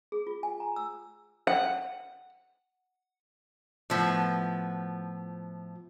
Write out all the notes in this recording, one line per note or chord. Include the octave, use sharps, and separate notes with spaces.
G#4
F4
G#5
A#5
E6
F#5
A2 F3 B3